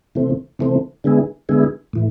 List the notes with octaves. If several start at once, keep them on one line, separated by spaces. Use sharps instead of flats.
C3 E3 A3 C4
C3 E3 A3 C4
D3 G#3 B3 E4 G#4
D3 G#3 B3 E4 G#4
A2 E3